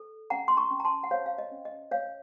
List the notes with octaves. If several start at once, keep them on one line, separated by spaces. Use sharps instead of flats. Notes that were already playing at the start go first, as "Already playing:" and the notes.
Already playing: A4
C#4 F#5 A#5
C6
A#5 C#6
C#4
A#5
A5 C6
F#5
C5 C#5 F5
F5
D#5
C#4
D#5
C#5 F5